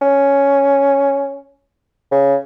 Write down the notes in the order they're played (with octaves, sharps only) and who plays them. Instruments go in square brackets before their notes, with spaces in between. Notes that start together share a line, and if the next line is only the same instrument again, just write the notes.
[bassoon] C#4
C#3